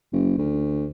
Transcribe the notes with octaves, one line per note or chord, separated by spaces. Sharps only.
F#1
D2